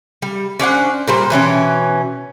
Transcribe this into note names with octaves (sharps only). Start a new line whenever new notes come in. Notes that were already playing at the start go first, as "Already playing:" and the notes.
G3
C#4 D4 C5 F#5
A#2 G3 C5
B2 E3 C#4 G5